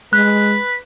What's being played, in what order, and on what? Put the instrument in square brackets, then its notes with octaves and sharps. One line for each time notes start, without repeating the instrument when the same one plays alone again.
[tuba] G#3 [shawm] B4 [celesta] F#6